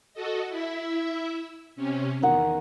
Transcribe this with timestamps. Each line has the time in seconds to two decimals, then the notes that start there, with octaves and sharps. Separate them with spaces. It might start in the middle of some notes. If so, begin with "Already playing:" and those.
0.14 F#4 A4 D#5
0.49 E4 E5
1.76 C3 C#4
2.22 E2 D#3 F#5